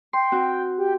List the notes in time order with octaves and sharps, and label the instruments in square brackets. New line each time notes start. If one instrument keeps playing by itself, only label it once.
[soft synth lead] G5 [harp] C6
[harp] C4 F#4
[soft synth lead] G4